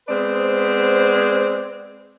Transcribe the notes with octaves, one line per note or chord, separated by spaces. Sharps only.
G#3 B3 C4 B4 C5 D5